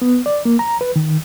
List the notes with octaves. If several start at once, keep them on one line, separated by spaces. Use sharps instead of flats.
B3
D5
A#3
A#5
B4
D#3